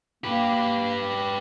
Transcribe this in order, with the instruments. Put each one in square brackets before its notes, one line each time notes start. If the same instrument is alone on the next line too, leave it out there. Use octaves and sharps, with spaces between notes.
[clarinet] A#3 [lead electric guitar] G4 B4